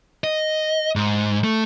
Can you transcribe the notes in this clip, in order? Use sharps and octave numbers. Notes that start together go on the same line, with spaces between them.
D#5
G#2
A3